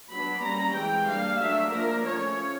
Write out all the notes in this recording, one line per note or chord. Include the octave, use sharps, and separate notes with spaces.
F#3 B3 D4 B5
G3 A#3 C#4 A#5
E3 G#3 C4 G5
G3 A#3 D4 F5
F#3 A3 D4 E5
F3 A#3 D4 A#4
F3 A3 C#4 C#5